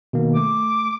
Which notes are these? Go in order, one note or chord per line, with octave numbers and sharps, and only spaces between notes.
B2 D#3 A#3
A3 D6